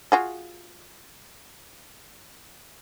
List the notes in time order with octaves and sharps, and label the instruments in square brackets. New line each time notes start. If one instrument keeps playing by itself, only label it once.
[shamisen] F4 F#4 G#4